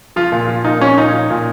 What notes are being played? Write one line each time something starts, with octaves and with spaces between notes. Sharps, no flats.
F3 F4
A#2
F3
A#2 D#4
F3 C#4
A#2 D#4
F3
A#2